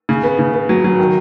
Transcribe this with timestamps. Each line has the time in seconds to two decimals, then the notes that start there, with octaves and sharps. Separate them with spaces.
0.09 C#3
0.23 B3
0.39 C#3
0.54 B3
0.69 F#3
0.84 F#3
0.99 D#3